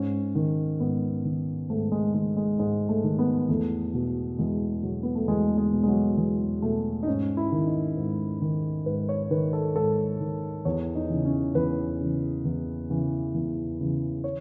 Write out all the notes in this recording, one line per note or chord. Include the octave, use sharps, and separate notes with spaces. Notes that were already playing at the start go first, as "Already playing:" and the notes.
Already playing: G#2 C#4
D#3
G#2 B3
D#3
G#2 A3
G#3
D#3 G#3
G#3
G#2 G#3
A3
D#3
B3
E2 A3
B2
E2 G#3
B2 F#3
B3
A3
E2 G#3
G#3
B2
G#3
F#3
E2 G#3
B2 A3
D#4
G#2 C#4
E4
D#3
D#4
G#2
D#3
G#2 B4
C#5
D#3 B4
A4
G#2 A4
D#3
E2 C#5
D#4
C#3 E3
C#4
E2 B4
C#3 E3
E2
C#3 E3
E2
C#3 E3
C#5